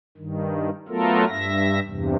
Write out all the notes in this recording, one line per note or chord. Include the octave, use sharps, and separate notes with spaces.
G2 D#3
F#3 A3 B3 F4 A4 A#4
G2 E5 A#6
E2 G2 C3